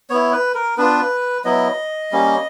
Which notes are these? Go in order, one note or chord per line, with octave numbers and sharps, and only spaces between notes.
B3 E4 C#5
B4
A#4
B3 D4 F4 B4
F#3 B3 E4 D#5
G3 A#3 C#4